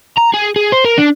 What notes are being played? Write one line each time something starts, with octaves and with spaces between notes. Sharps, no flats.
A#5
G#4
G#4
C5
A#4
D4